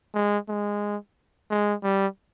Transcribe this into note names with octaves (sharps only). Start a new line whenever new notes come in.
G#3
G#3
G#3
G3